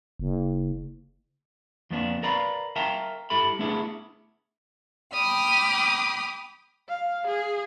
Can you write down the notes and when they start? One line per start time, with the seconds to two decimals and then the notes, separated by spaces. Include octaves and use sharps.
0.19 F#1
1.91 F2 F3 A#3 B3 D4
2.23 A#4 B4 D5 F5 A#5 B5
2.76 A#4 E5 F5 G5 A5 A#5
3.30 G2 E4 G4 A4 B5
3.59 A3 B3 D4 E4 G#4
5.13 G5 B5 D6 D#6 F6
6.88 F5
7.27 G#4